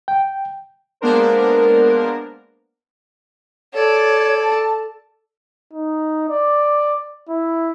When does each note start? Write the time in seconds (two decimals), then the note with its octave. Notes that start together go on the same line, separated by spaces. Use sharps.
0.08 G5
1.01 G#3 A#3 B3 D4 A#4 C5
3.74 A4 C#5 D5
4.40 A5
5.73 D#4
6.29 D5
7.29 E4